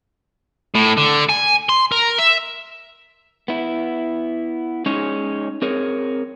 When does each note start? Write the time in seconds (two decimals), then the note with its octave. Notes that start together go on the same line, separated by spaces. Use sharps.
0.75 A2
0.98 D3
1.29 G#5
1.69 C6
1.92 A#4
2.18 E5
3.48 B3 E4
4.86 G#3 C#4 D#4 G#4 C#5
5.62 C4 G#4 A#4 C#5